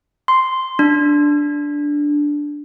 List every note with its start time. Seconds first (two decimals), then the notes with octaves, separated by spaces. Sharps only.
0.28 C6
0.79 D4